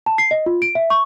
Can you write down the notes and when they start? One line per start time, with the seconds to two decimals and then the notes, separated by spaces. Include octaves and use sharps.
0.06 A5
0.18 C7
0.31 D#5
0.46 F4
0.62 D7
0.75 E5
0.90 C#6